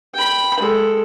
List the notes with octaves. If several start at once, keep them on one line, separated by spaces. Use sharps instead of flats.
G5 B5
G#3 A4